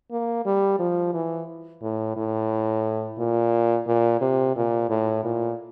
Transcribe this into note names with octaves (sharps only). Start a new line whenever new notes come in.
A#3
G3
F3
E3
A2
A2
A#2
A#2
C3
A#2
A2
A#2